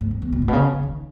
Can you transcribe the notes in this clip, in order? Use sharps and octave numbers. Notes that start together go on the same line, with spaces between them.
G#2
F#2
E2
B2
A2
B2
C#3
C#3
D#3